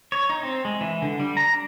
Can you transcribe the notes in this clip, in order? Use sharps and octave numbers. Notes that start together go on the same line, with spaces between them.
C#5
D#4
C4
G#3
E3
D3
G3
A#5
D4